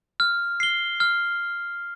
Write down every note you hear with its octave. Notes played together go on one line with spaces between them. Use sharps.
F6
C7 G7
F6